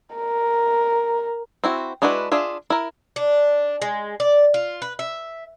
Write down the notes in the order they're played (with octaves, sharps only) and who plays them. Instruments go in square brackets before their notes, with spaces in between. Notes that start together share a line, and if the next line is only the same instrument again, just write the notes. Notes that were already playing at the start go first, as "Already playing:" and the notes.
[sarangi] A#4
[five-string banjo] C4 E4 F#4
G#3 D4 E4 F#4 B4
D4 F4 G#4 E5
E4 A#4
[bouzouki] D4
G#3
D5
F4
B4
E5